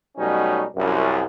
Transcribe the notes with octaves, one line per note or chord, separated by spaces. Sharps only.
B2 F#3 G3 A3 C#4 D#4
C2 F#2